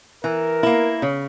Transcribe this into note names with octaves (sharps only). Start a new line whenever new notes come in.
E3 A#4
A#3 E4
C#3